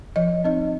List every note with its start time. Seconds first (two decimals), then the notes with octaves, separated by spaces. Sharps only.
0.16 F3 D#5
0.44 C4 D#4 D#5